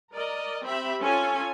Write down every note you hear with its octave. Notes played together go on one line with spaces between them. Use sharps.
A#4 D5 D#5
C4 G4 E5 B5
C#4 F4 A4 C#5 G#5